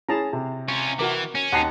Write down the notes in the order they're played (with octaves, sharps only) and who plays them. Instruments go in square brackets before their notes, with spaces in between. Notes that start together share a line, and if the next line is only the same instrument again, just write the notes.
[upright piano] C#4 G#4 [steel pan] E4 A5 A#5
[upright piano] C3
[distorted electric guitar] C#4 F4 [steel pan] C#6
[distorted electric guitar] E3 [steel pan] F#4 A#4 D6
[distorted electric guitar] C#4
[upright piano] D#2 A5 C7 [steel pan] F#5 A#5 D#6